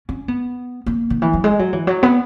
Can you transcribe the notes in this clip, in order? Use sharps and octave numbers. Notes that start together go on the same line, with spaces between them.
C#4
B3
A#3
D#3
E3
F#3
G#3
F#3
E3
F#3
B3